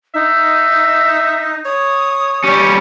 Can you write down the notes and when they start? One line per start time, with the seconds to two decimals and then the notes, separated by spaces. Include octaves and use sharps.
0.14 D#4 E5
1.65 C#5 D#6
2.44 G3 C#4 G4